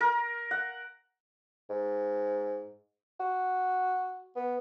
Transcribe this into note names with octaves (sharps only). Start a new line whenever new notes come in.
A#4
F#5
G#2
F#4
B3